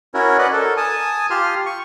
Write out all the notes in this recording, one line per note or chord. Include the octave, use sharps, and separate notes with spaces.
C#4 E4 F#4 A#4 C#5
B4 D5 D#5 F#5
A4 A#4
G#5 A5 D#6
F4 G4 C6 F6
C#6